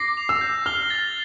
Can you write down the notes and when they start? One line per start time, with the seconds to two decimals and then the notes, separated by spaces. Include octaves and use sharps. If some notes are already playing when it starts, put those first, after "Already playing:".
Already playing: D6 A#6 C7
0.17 F7
0.29 E6
0.41 G6
0.66 F6 G7
0.90 A6